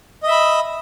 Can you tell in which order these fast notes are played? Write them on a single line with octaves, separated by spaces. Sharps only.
D#5 E5 B5